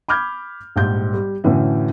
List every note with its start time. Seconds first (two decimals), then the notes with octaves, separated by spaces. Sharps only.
0.08 B5 D6 F6 G6 G#6
0.76 A#1 G#2 G3 G6
1.13 G3
1.44 F#2 A2 D3 E3 C#4